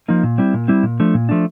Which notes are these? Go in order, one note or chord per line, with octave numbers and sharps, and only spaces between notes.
F3 A#3 D#4
A#2
G3 C4 E4
A#2
G3 C4 E4
A#2
F3 A3 D4
A#2
F3 A3 D4